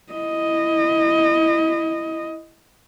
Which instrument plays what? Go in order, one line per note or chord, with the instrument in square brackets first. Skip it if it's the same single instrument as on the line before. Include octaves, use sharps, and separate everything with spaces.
[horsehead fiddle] E4 D#5